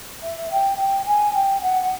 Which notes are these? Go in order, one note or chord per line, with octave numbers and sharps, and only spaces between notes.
E5
G5
G5
G#5
G5
F#5